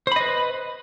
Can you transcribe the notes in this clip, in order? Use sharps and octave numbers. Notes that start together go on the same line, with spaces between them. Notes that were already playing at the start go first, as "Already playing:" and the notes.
B4 C5 D#5 B5